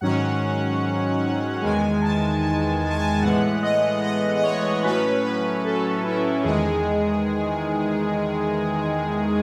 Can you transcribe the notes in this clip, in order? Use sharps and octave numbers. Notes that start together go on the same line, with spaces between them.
G#2 D#3 F#3 C#4 F#5
E2 D#3 G#3 G#5
A5
A5
G#5
A5
G#5
A2 E3 G#3 B3 F#5
D#5
D#5
D#5
C#5
A2 F#3 C#4 B4
B4
B4
A4
E4
E2 D#3 G#3 G#4